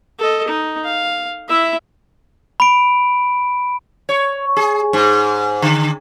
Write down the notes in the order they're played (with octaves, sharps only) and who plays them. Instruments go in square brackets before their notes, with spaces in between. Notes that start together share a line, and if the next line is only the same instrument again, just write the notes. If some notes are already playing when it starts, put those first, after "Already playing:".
[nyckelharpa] A4 D#5
D#4
F5
E4 E5
[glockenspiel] B5 D7
[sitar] C#5
G#4
G#2
D3